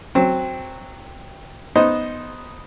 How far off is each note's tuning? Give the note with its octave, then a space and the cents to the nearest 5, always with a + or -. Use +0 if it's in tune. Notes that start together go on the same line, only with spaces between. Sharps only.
F#3 +0 C4 +0
B3 +0 D#4 +0 C5 +0